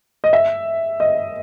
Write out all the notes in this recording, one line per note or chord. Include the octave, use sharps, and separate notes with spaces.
D#5
E5
D#5